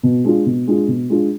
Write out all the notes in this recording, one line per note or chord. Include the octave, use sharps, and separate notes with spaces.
B2
G#3 D4 F4
B2
G#3 D4 F4
B2
G#3 D4 F4